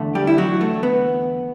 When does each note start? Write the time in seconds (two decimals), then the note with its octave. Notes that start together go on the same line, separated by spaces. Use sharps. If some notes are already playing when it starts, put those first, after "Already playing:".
Already playing: E2 D3 A3
0.15 G3 G4
0.27 E4
0.38 F#3 F#4
0.61 A3
0.83 B3